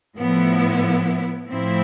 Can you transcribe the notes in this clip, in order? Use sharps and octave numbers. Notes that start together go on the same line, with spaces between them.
A2 F3 B3 E4
A2 F3 C4 E4